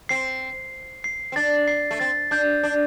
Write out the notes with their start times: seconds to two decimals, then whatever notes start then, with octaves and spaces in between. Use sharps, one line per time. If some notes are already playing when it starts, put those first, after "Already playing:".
0.09 C4 C7
1.04 C7
1.32 C4
1.36 D4 A6
1.68 C7
1.91 A3
2.00 C4 A6
2.31 D4 G6
2.63 D4